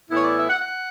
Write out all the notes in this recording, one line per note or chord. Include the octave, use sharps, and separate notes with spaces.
A2 E3 B3 E4
C#5
D5
E5
F#5
F#5